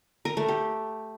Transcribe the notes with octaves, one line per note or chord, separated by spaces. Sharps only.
A#4
A3
G4